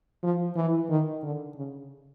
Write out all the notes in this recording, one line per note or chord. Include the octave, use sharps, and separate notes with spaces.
F3
E3
D#3
D3
C#3